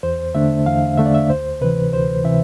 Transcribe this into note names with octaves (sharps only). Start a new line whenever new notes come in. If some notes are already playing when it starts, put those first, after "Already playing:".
E2 C5
D3 A3 D4 E5
E2 F5
D3 A3 D4 E5
D5
E5
D2 C5
C3 E3 B4
D2 C5
C3 E3 E5